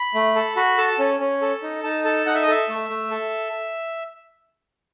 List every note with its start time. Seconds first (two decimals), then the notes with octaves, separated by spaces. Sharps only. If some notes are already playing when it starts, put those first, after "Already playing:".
Already playing: B5
0.14 A3
0.35 A4
0.56 F#4 B5
0.78 A4 A5
0.99 C#4
1.20 C#4
1.42 A4
1.62 D#4
1.83 D#4 A5
2.05 A4 A5
2.26 D#4 F#5
2.35 E5
2.43 D#5
2.48 A4 E5
2.69 A3
2.89 A3
3.11 A4